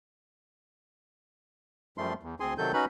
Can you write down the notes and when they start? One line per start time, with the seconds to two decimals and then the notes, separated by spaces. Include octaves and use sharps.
1.98 F#2 F3 G3 A3 C6
2.23 E2
2.40 D2 C4 G#4 G#5 C6
2.58 C3 D#3 F#3 A4 G6
2.74 C#4 D#4 F#4 B4 B5